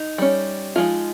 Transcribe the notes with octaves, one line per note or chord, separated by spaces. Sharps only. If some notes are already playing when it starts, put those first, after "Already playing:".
Already playing: D#4
G3 C#4
F3 G#3 D#4 F4